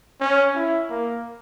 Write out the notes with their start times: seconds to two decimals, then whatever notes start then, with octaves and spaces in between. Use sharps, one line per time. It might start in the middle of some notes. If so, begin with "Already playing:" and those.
0.20 C#4
0.55 E4
0.90 A#3